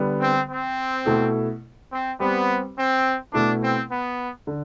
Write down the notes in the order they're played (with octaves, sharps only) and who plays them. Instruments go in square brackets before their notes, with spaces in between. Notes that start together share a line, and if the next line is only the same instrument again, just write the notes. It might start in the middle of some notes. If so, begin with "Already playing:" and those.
Already playing: [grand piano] D3 G3 B3
[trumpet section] C4
C4
[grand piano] B2 A3 E4 A4
[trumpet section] C4
[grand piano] G3 C4 G4 B4 [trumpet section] B3
[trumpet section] C4
[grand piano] B2 A3 E4 B4 [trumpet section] D4
[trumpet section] C4
B3
[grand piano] D3